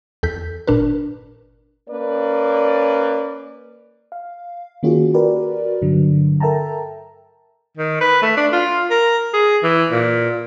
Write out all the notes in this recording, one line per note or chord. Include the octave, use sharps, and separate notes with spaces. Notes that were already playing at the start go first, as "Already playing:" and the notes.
E2 A4 G6 B6
G1 A#2 D4 A#4 B4
A#3 C#4 B4 D5
F5
D#3 A#3 C#4 F4 F#4 G#4
F#4 G4 A#4 B4 D5
G2 D3 F#3
A4 A#4 E5 G5 A5 A#5
D#3
B4
A3
D4
F4
A#4
G#4
E3
A#2